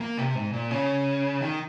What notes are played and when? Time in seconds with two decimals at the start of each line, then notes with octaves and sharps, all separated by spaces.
0.01 A#3
0.17 C3
0.35 G#2
0.53 A#2
0.71 C#3
1.41 D#3